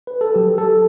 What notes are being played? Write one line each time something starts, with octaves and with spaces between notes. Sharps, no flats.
B4
A4
F#3 G4
A4